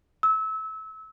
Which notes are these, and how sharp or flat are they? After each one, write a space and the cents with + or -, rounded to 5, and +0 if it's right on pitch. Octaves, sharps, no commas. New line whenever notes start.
E6 -25